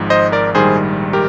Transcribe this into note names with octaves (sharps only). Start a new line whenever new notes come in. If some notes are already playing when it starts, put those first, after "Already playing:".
Already playing: G#1 G#2 F3
C5 D#5
A#4 D5
A#1 G#2 D#3 G3 G#4 C5
G4 A#4